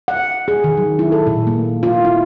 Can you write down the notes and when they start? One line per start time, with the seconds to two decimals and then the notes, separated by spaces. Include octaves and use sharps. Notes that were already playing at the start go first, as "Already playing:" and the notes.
0.08 F#5
0.48 G#4
0.64 D#3
0.77 F#3
0.99 E4
1.12 A4
1.27 A#2
1.47 A#3
1.83 F4
2.05 E4